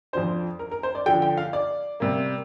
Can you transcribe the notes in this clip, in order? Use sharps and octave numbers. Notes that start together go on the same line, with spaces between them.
F2 F3 D4 C5
A#4
A#4
C5
D5
D3 F3 D4 G5
G5
F5
D5
C3 G3 A#3